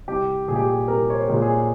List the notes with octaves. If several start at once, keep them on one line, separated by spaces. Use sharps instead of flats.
C2 G4
A#2 G#3 G4 G#4
G#4
C2 A#4
C#5
C5
A#2 G#3
G#4